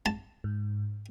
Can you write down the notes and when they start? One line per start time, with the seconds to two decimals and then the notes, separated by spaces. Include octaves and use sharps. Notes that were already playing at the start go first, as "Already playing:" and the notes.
0.06 A5
0.44 G#2